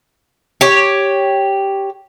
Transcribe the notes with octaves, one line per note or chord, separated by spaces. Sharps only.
G4 C#5